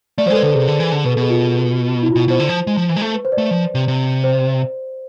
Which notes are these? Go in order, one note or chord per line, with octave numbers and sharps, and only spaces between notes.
A3 D5
F3 C5
G#3 A4
B4
D3 A4
C3 G#4
D3
E3
D3
B2 B4
A4
B2 G#4
F4
E4
F4
B2
B2 C5
D3
F3
G#3
F3
E3
G#3
A3
B4
C5
D5
A3
F3
C3
C3
C5